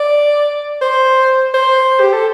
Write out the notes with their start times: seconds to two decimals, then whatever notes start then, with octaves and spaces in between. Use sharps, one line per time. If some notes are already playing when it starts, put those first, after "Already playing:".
Already playing: D5
0.82 C5
1.54 C5
2.00 G4
2.13 A4